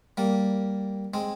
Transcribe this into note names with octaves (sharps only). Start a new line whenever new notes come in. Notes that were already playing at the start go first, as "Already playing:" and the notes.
G3 A#3
G#3 C4